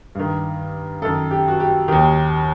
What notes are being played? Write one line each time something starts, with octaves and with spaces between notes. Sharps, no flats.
G2 D#3
F#2 D#3 A4
G4
F#4
G4
D#2 D#3 G4